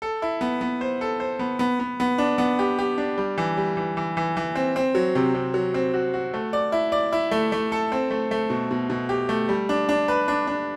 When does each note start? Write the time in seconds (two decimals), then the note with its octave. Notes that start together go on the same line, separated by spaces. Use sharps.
0.02 A4
0.22 E4
0.41 B3
0.61 B3
0.81 C5
1.01 A4
1.20 C5
1.39 B3
1.59 B3
1.80 B3
2.00 B3
2.18 D4
2.38 B3
2.59 G4
2.79 G4
2.98 D4
3.18 G3
3.38 E3
3.57 G3
3.77 E3
3.97 E3
4.17 E3
4.37 E3
4.55 C4
4.76 C4
4.95 F#3
5.15 C3
5.35 C3
5.54 F#3
5.74 C4
5.94 F#4
6.14 F#4
6.34 A3
6.53 D5
6.72 E4
6.92 D5
7.12 E4
7.31 A3
7.52 A3
7.72 A4
7.92 C4
8.11 A3
8.31 A3
8.50 B2
8.71 B2
8.90 B2
9.09 G4
9.29 A3
9.49 G3
9.69 D4
9.89 D4
10.08 B4
10.28 D4
10.47 D4